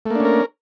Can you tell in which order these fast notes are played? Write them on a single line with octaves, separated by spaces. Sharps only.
A3 A#3 D4 C#4 A#4